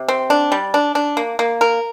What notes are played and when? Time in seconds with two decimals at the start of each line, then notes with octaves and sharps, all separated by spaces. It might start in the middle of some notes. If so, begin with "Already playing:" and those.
Already playing: C3
0.08 C4
0.30 D4
0.52 G3
0.74 D4
0.95 D4
1.17 A#3
1.39 A#3
1.61 A#4